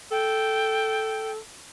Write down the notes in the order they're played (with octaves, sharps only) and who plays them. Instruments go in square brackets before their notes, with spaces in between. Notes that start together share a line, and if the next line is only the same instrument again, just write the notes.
[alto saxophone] A4 [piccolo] G5